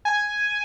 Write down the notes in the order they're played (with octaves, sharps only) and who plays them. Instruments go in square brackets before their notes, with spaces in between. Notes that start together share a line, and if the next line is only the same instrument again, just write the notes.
[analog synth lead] G#5